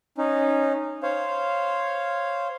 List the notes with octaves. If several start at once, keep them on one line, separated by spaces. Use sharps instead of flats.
C#4 D#4
C5 C#5 F5